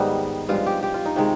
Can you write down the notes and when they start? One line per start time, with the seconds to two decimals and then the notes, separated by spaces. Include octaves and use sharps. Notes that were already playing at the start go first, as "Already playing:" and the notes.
Already playing: G#2 D#3 G3 B3 D#4
0.49 G2 F3 G#3 F4
0.66 G4
0.83 G4
0.94 F4
1.05 D#4
1.16 C3 D#3 G#3